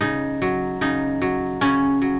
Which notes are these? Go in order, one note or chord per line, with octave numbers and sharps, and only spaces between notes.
C#3 D#4
F#3
C#3 D#4
F#3
C#3 C#4
F#3